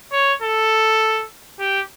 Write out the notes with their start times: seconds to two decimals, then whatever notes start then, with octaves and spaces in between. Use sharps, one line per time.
0.12 C#5
0.42 A4
1.60 G4